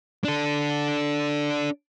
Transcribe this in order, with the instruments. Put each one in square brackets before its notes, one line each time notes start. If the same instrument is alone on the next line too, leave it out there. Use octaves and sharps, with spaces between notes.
[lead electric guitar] D4 A4